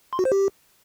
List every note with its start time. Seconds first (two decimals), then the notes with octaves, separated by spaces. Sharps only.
0.13 C6
0.19 F#4
0.25 C5
0.32 G4